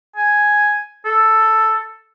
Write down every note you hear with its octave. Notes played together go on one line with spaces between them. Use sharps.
G#5
A4